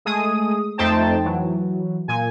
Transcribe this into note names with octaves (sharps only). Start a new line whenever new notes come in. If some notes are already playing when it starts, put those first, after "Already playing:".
G#3 A3 G#4 D#6
F2 A3 D#4 C5 G5 A5
E3 F#3
A#2 G#5